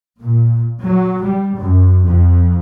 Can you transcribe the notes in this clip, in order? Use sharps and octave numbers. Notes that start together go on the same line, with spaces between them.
A#2
F#3
G3
F#2
F2